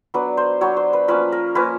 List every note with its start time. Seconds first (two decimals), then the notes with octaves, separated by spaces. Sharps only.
0.14 F#3 B3 D4 B4
0.37 C5
0.61 F#3 B3 D4 C#5
0.77 C5
0.93 B4
1.08 F3 A#3 C#4 B4
1.32 A#4
1.55 F3 A#3 C#4 B4